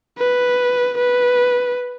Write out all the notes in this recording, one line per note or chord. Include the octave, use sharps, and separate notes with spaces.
B4
B4